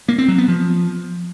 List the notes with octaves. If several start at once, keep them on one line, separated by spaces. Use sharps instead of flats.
A#3
C4
F#3
B3
F3